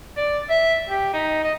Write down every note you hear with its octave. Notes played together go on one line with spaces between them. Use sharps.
D5
E5
G4
D#4
D#5